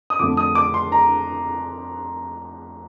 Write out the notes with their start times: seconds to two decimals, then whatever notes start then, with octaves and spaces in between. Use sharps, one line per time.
0.10 D#6
0.19 F2 D3 A3 D6
0.37 D#6
0.55 D6
0.74 C6
0.92 A#5